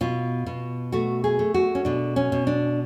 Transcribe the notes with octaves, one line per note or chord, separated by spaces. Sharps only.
B2 F4
B2
A3 F#4
G#4
A3
F#4
C#4
B2 D4
C#4
B2
D4